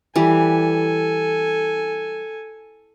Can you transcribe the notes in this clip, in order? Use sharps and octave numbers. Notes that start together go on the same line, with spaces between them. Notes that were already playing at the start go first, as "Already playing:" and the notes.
E3 G3 A4 G#5